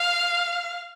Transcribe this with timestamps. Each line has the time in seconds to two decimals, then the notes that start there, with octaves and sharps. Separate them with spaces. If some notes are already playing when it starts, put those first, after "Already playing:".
Already playing: F5